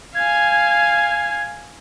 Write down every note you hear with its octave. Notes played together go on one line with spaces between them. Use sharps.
F5 G#5 G#6